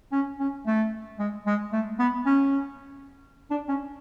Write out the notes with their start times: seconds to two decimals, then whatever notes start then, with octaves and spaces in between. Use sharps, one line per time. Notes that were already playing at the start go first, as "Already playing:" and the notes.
0.12 C#4
0.40 C#4
0.66 A3
1.19 G#3
1.46 G#3
1.72 A3
1.99 B3
2.26 C#4
3.50 D4
3.68 C#4